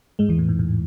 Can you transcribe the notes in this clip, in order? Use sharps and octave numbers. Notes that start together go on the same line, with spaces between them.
G#2 G#3
E2 E3
A2
G#2
A2